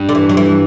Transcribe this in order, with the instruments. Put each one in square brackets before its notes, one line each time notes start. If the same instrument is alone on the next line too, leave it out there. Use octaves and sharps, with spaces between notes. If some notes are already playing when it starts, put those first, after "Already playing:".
Already playing: [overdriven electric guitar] G2
[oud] D3
E3
F#3
E3